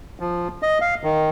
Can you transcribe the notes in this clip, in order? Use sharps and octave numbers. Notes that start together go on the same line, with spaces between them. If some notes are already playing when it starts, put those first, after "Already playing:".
F3
D#5
F5
D#3